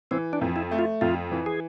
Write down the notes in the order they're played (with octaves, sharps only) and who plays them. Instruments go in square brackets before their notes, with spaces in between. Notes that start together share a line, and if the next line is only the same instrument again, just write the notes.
[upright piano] E3 [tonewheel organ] C4
[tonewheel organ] D4
[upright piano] F2
[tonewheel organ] E4
[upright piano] A3
[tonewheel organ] F4
[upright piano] F2 [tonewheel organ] F4
[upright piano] E3
[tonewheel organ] G#4